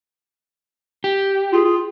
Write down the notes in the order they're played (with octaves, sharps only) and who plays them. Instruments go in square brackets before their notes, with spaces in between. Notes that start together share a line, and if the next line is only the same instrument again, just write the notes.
[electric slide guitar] G4
[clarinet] F4 [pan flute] G#4
[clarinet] F4